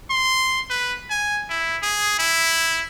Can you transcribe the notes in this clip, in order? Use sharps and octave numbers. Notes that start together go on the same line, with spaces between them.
C6
B4
G#5
E4
G#4
E4